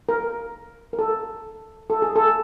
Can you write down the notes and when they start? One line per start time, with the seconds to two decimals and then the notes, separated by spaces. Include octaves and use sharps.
0.09 A#4
0.93 A#4
0.99 A4
1.90 A4
2.02 G#4
2.16 A4